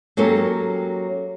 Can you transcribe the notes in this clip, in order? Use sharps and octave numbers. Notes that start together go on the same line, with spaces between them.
F#3 A#3 C#4 G4 A4